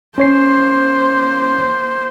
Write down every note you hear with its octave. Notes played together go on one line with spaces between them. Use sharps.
A#3 C#4 C5 C#5 C7